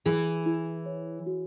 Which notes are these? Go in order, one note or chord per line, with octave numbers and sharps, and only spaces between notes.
E3 G#4
E4
C#5
F#4